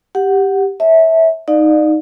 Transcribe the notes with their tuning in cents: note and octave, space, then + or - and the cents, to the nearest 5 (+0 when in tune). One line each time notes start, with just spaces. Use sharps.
G4 +0 F#5 +0
C#5 +0 E5 -20 A5 +0
D#4 +0 D5 +30 F5 +30